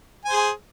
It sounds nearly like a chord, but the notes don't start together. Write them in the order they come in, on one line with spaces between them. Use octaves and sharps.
G#5 C5 G#4